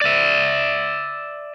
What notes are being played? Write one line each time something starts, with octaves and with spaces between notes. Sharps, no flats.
D5 E5